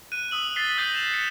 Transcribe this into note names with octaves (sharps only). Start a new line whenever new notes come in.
F#6 D#7
D#6 E6 F#7
A6 B6 C7 G7
D#6 G6 A#6 C7 D#7
E7 F7
C#7 E7